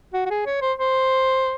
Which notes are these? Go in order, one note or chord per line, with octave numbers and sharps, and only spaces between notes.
F#4
F#4
G#4
C#5
C5
C5